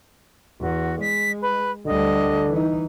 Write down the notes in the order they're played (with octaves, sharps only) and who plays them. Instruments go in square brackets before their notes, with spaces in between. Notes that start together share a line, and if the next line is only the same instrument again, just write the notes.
[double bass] E2 [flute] F#4
[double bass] G#3 [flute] B6
[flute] B4
[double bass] D2 G3 [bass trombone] D3 [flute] D#5
[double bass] E3 D#4